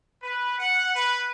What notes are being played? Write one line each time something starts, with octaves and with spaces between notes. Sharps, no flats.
B4
F#5
B4